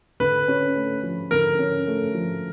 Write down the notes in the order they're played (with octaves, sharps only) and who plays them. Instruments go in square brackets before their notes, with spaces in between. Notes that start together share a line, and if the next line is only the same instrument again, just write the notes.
[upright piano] D3 [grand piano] B4
[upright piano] C#4
A3
F3
[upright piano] D3 [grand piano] A#4
[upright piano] C#4
A3
F3